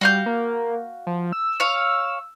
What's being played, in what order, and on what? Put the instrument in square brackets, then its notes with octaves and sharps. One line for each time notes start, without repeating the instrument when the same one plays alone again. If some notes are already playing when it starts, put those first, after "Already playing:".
[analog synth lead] G3 [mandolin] F#4 F5 G6
[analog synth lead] A#3
F3
E6
[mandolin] C#5 F5